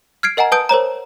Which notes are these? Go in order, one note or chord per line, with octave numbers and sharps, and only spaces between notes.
F6 G#6 C7 D7
A#4 D#5 F#5 G#5 A#5
B4 A5 D#6 G6 D7
A#4 C5 C#5 A#5